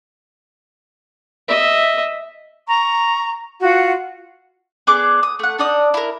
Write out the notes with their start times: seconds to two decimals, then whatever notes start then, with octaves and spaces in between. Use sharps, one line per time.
1.48 D#5 E5
2.68 A#5 C#6
3.61 F4 F#4 F#5
4.87 B3 D4 G#4 D6
5.23 D#6
5.39 A3 F#5
5.58 D4 D#4 D5 D#6
5.94 E4 A#4